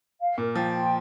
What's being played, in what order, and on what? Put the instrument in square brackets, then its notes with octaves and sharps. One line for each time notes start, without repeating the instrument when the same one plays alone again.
[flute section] F5
[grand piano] A#2 [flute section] A#4
[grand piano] F3 [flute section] G5
[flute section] F4